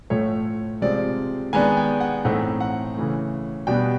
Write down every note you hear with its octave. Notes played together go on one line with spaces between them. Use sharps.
A2 F3 A3 C#5
C3 F3 G#3 C4 D5
D#3 G#3 B3 D4 G#5
G5
F#5
A2 E3 A3 C4 D#4 F#5
F#5
C#3 E3 A3
B2 G3 B3 D4 G5